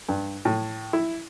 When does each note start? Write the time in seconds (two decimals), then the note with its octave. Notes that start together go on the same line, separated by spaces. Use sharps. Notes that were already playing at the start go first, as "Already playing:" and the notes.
0.09 G2
0.45 A2
0.93 E4